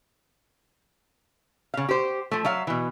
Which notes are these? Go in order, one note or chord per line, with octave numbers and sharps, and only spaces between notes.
C#3 F5
G4 C5
F3 A3
F#3 E5 F5
B2 E3